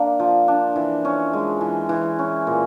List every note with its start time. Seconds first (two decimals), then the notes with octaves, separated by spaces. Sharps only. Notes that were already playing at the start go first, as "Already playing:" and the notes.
Already playing: A#3 D4
0.19 F3
0.48 D4
0.76 E3
1.05 C#4
1.33 G#3
1.61 E3
1.89 E3
2.19 C#4
2.47 A#2